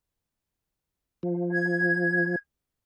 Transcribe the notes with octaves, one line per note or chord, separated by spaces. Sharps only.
F3
G#6